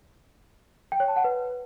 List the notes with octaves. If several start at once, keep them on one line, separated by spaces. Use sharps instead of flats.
G5
C#5
A5
F#5
B4